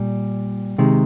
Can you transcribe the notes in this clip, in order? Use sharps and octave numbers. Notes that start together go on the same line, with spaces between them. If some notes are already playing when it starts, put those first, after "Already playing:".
Already playing: A#2 G3
C3 D#3 G#3